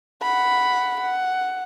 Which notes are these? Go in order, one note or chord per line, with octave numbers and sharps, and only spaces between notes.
F#5 B5
F#5